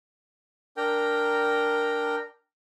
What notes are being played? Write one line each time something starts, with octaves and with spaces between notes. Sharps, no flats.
D4 A#4 G5 A#5